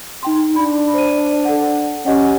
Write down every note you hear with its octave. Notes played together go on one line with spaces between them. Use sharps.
D#4 G5 C6
D4 B5
C5 D#7
A4 F#5
C#4 G4 D#5 F#5